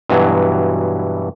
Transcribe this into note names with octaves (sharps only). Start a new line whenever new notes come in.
G2 B2 E3 F#3